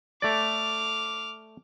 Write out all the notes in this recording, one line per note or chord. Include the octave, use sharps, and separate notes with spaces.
A3 D5 D6 F6